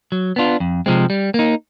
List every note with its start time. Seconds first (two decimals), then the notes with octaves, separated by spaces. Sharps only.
0.12 F#3
0.36 B3 D4 F4
0.60 F2
0.86 C3 F3 G#3 C4
1.10 G3
1.34 A#3 D#4